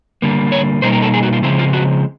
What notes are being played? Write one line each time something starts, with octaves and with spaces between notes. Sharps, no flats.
D3 G3 A#3
C#5
B2 G3 A#3 D#4 C5
A#4
A4
G#4
F#4
F4
C#3 F3 G#3 C4 E4
F4
F#4